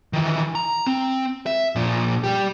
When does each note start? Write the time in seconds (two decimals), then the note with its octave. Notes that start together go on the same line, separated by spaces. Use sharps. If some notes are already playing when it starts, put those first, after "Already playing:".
0.13 D#3 E3
0.55 A#5
0.86 C4
1.46 E5
1.76 A#2 F3
2.24 G3 G4